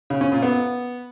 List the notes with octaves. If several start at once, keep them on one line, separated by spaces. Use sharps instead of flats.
C#3
C#4
A#2
B3